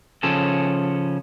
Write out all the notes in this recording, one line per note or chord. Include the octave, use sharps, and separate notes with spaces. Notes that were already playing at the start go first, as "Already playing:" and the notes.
C#3 F3 C#4 A4